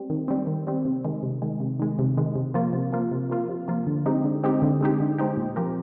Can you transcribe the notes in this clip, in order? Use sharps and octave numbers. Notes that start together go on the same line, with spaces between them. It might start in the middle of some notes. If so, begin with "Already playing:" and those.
Already playing: G3 C4
D#3
G3 C4
D#3
G3 C4
C3
D#3 G#3
C3
D#3 G#3
C3
D#3 G#3
C3
D#3 G#3
C3
F3 A#3 F4
C3
F3 A#3 F4
C3
F3 A#3 F4
C3
F3 A#3 F4
D3
G#3 C4 D#4 G4
D3
G#3 C4 D#4 G4
D3
G#3 C4 D#4 G4
D3
G#3 C4 D#4 G4
A#2
F3 C4 G4 A#4